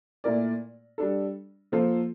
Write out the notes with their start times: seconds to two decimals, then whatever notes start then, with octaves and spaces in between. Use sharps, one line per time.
0.24 A#2 A3 E4 A#4 D5
0.98 G3 D4 A4
1.72 F3 A#3 F4 A4 C5